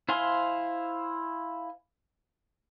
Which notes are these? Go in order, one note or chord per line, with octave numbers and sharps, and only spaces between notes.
E4 C5 F5 G#5 C6